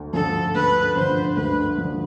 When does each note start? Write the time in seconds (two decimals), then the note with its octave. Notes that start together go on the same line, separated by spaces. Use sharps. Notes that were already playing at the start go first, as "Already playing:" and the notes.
Already playing: D2
0.13 D3 F3 A4
0.55 D2 B4
0.96 D3 F3 C5
1.36 D2 B4
1.78 D3 F3